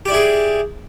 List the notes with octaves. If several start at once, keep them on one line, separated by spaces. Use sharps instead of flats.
E4 G4 G#4 D5